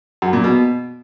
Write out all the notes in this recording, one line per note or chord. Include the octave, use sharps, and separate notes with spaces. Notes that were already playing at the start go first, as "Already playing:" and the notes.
F#2
A#2
B2